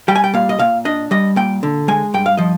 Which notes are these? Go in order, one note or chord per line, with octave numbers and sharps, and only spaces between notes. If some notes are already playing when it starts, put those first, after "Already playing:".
G3 G5
G#5
G5
A#2 F5
D#5
A#2 F5
D4 D#5
G3 D#5
A#2 G5
D3
G#3 G#5
G2 G5
F5
F3 D#5